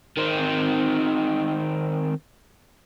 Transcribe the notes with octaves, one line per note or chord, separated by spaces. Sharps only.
D#3 C4